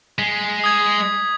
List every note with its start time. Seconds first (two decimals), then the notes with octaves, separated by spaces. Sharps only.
0.19 G#3 B6
0.64 D#6 G#6